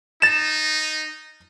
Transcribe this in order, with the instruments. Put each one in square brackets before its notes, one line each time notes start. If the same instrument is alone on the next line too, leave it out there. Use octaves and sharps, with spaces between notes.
[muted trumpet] D#4 [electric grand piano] A6 E7